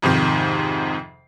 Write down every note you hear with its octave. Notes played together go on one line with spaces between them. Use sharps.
F2 G#2 C3 D#3